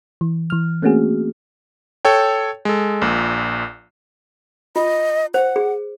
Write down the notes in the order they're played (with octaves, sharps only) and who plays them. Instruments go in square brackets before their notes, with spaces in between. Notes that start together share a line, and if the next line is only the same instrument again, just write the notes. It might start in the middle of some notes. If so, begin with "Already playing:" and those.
[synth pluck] E3
E3 F6
A3 A#3 C4 C#4 F#4 G#4
[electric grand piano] A4 C#5 G5
G#3 A4
A#1 A#2
[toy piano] F4 [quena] D#5
[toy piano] C5 [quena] F#5
[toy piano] G#4